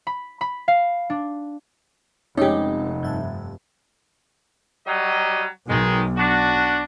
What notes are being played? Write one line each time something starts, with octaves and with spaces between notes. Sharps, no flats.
B5
B5
F5
D4
F1 G#3 C4 C#4 D#4 G4 C#5
G2 E5 A5
F#3 G3 D#5
B1 D#3 G#3
D4 F#4